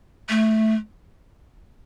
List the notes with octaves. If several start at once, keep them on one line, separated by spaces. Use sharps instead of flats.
A3